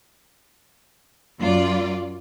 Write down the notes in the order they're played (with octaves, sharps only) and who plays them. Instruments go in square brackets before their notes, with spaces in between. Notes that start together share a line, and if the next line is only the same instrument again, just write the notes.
[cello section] F#2 F4 D5